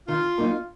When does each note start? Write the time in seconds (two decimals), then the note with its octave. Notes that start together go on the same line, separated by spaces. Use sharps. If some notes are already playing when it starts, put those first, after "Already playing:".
0.08 D#3 F4
0.38 F#3 A#3 D#4